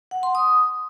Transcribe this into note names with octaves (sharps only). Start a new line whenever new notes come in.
F#5
C6
D#6